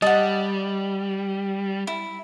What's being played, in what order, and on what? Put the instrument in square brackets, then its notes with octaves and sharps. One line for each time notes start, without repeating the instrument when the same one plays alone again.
[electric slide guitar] G3 [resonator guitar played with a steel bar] D#5 [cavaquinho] F#5 A5
[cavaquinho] E4